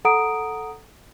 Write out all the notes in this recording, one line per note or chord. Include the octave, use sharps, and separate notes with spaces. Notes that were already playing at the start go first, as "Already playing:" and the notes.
A4 F#5 A#5 D#6 D7